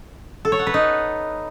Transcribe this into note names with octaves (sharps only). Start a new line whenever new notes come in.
A4
C#5
F#5
B4
D#4